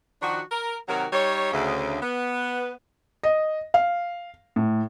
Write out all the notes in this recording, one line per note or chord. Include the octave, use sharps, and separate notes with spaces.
D#3 F3 D4 F#4
A#4
C3 D#3 F#3 F#4 A#4
G3 D#4 C#5
D2 C#3
B3
D#5
F5
A2